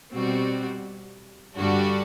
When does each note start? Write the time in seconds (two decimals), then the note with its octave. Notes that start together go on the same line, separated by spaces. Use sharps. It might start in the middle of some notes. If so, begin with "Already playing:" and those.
0.13 B2 G3 C4 F#4
1.55 G2 D3 G3 D4 F#4